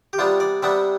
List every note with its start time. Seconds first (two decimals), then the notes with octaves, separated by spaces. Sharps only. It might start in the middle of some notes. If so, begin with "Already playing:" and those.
0.13 G4
0.18 C3 G3 B3 D4 F4
0.40 D5
0.62 C3 G3 B3 D4 E5